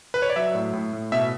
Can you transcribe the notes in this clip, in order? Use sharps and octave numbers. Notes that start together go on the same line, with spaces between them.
B4
C#5
D5
F#3 E5
A2
A2
A2
B2 E5